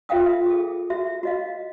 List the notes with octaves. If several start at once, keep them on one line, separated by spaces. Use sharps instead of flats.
F4 A4 E5 F5 G5 D#6
G#4 A4
F#4 E5
F#4 D#5 F5